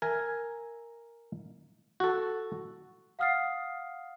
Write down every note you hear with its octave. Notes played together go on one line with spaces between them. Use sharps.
A#4 E5 G#5
F#4 A4
F5 F#5 D#6 F6 A6 C7